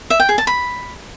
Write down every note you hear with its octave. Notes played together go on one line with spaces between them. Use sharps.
E5
G5
G#4
A5
B5